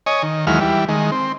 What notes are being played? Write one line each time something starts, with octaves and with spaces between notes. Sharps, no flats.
C#5 D#5 G#5
D#3
D#2 E3 F#3 G#3 F6
E3 G3
D#3 G#3
C4